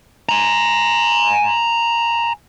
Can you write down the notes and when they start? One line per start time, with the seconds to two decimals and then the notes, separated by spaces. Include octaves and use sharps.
0.29 G#5 A#5